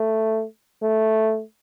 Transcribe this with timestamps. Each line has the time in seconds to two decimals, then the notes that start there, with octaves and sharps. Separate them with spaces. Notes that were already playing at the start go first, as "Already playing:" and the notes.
Already playing: A3
0.82 A3